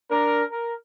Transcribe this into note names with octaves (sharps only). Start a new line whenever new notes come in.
D4 A#4
A#4